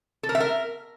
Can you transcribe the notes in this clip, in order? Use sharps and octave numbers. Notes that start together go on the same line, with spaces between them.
A4
A#4
E5
A#4